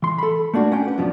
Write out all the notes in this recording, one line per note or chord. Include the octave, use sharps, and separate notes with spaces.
E3 C6
A4 B5
A3 A#3 D4 F#4
C#4 D4 G5
B4 F#5
F#2 B2 F3 B3 D4